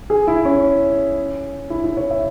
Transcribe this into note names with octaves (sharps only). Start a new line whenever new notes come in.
G#4
E4
C#4
E4
E4
C#5
E5